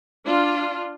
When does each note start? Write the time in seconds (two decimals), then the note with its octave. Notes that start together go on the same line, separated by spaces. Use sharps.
0.24 D4 F4